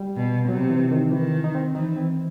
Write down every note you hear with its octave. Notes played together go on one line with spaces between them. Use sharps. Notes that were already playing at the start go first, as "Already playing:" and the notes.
Already playing: G3
B2
C3 F#3
E3
D#3
D#3 E3
D#4
C4
E3 D#4
C4